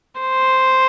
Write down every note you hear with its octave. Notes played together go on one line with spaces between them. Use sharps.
C5